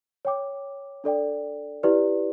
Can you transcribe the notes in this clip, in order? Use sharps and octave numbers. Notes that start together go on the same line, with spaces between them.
C#5 G5 D6
D4 A4 D5 G5
E4 G4 B4 D5